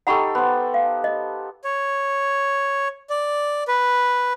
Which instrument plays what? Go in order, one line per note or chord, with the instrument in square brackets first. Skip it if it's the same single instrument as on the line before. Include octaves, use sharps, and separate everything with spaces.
[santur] D#4 G4 A4 [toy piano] F#5 B5 C#6
[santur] B3 C5
[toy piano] F5
D#5
[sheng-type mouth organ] C#5
D5
B4